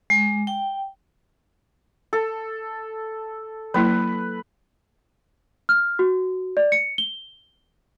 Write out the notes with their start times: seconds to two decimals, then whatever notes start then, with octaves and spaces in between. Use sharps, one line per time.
0.10 G#3
0.47 G5
2.13 A4
3.74 F#3 A#3 E4 B4
5.69 F6
5.99 F#4
6.57 D5
6.72 C#7
6.98 G7